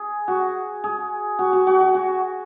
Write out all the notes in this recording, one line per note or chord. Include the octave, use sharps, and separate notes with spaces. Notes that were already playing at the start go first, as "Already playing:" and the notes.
Already playing: G#4
F#4
G#4
F#4
F#4
F#4
F#4
F#4